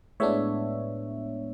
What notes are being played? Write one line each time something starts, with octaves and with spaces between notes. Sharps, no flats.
A2 G#3 B3 D4 C#5 E5